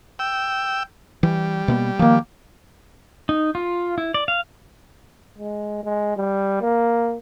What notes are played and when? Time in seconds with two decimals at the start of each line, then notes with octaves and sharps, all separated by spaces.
0.19 G5 E6
1.23 E3 G3
1.68 B2 A#3 B3
1.99 D#3 F3 A#3
3.29 D#4
3.55 F4
3.98 E4
4.14 D5
4.28 F5
5.38 G#3
5.84 G#3
6.17 G3
6.61 A#3